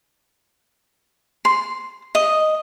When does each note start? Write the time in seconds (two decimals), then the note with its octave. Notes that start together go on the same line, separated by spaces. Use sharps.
1.45 C6
2.15 D#5